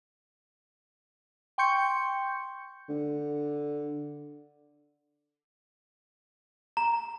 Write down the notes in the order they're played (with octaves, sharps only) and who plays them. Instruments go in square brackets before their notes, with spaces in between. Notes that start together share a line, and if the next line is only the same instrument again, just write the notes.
[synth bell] G5 C6 C#6 G6 C#7
[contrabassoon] D3
[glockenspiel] A#5